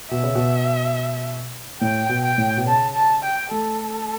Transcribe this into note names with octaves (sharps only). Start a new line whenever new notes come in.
B2 E5
C#3
B2
A2 G5
B2
G5
A2
B2
C#3 A5
A5
G5
A3 A4